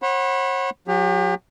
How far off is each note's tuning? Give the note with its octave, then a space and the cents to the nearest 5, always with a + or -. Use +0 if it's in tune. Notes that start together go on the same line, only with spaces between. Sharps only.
C#5 -45 F#5 +0 B5 +0
F#3 -20 G4 +35